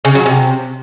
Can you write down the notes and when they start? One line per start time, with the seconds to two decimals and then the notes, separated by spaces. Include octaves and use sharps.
0.05 C#3
0.15 F#3
0.26 C3